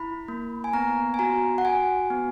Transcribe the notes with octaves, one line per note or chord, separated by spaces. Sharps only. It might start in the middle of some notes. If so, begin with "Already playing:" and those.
Already playing: E4 B5
A#3
G#5
B3 A#5
G#5
F#4 A#5
F#5
F#4 G#5
B3